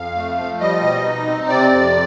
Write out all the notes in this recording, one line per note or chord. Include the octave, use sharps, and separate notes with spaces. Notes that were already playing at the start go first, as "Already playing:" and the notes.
Already playing: F2 F5
A3
F3
G3 D#5
B2
D#4
C4
C3 D5
F2